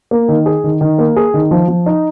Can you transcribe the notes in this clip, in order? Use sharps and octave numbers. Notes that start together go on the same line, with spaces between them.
A#3
D#3
G#4
D#3
D#3
A#3
G#4
D#3
F3
F3
D#4